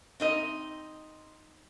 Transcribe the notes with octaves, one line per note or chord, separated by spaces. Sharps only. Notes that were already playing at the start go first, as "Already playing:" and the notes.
C4 D#4 D#5